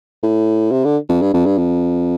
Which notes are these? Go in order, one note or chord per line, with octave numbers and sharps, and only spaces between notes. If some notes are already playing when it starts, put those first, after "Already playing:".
A2
C3
D3
F2
G2
F2
G2
F2